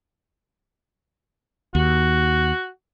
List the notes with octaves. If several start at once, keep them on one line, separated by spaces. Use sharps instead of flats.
D#2 F#4